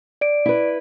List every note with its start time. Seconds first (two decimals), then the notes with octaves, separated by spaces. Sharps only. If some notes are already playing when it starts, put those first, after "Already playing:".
0.21 D5 D7
0.46 E4 B4